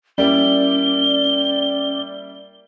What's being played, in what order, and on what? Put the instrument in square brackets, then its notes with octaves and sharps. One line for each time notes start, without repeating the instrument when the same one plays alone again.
[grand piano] G3 A#3 E4 [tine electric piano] C#4 [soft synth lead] D5 [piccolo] G7